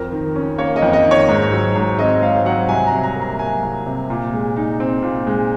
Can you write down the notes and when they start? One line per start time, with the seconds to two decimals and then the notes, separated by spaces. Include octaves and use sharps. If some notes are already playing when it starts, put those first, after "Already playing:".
Already playing: F2 A#4
0.12 D#3
0.36 C#4
0.58 A#3 C#5
0.76 D#5
0.82 F2
0.93 D#5
1.05 D#3
1.11 C#5
1.28 G#2
1.52 F#3
1.75 G#2
1.99 C4 D#5
2.22 G#2 F5
2.45 F#3 F#5
2.69 C2 G#5
2.87 A#5
2.92 C3
3.03 A#5
3.16 A#3
3.22 A#5
3.39 F#3 G#5
3.63 C2
3.86 C3
4.10 A#2
4.33 G#3
4.57 D#4
4.80 C4
5.02 A#2
5.27 G#3